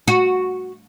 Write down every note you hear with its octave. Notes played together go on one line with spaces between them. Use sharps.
F#4